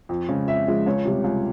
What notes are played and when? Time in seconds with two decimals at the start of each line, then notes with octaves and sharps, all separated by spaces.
0.09 F2
0.29 C#3 F3 G#3
0.47 F2 E5
0.67 C#3 F3 G#3
0.86 C#2 C#5
1.05 C3 G3
1.24 C#2